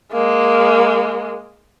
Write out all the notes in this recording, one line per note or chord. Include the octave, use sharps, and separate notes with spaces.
G#3 A#3